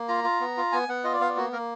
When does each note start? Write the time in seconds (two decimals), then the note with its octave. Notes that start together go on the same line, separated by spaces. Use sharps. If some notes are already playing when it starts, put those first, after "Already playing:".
Already playing: A#3
0.08 F4 A#5
0.24 F4
0.40 B3
0.57 F4
0.72 B3 G#5
0.89 B3 F#5
1.04 F4 D#5
1.13 D5
1.20 B3 F5
1.29 D5
1.37 A#3 F#4
1.53 A#3 A#4